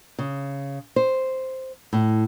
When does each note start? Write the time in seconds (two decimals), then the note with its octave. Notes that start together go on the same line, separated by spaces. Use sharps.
0.19 C#3
0.96 C5
1.93 A2